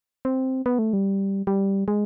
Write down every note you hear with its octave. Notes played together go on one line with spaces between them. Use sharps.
C4
B3
A3
G3
G3
G#3